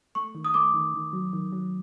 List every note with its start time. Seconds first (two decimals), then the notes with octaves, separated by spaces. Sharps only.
0.15 A3 C#6
0.35 D#3
0.44 D#6
0.54 A3 D6
0.74 D#3
0.94 D#3
1.13 F#3
1.33 D#3
1.52 F#3